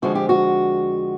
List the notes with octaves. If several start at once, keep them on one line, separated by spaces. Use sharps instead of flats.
F2 D3 F3 G#3 F#4
G4
F#4